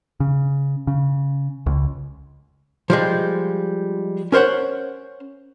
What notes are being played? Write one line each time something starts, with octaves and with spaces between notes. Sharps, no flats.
C#3
C#3
C#2
F3 G3 G#3
C#4 A#4 C5 C#5 F#5